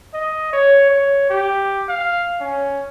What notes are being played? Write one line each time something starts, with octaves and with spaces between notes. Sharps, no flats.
D#5
C#5
C#5
G4
F5
C#4